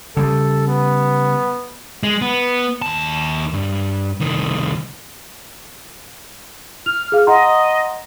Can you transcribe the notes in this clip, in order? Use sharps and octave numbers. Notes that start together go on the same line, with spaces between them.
C#3 G3 A4
B3
G#3
B3
D#2 A5
G2
C2 D#3
F6 F7
G#4 F5
D#5 F#5 A#5 C6